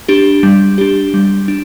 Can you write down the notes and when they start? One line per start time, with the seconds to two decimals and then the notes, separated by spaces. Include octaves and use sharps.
0.08 D4 G4
0.43 G3
0.78 D4 G4
1.14 G3
1.48 D4